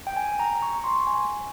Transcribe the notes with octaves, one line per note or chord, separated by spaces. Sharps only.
G5
G#5
A#5
C#6
C6
G#5